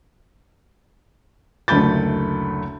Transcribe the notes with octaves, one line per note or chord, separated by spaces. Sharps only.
F#1 D2 A3 B5 G6 A6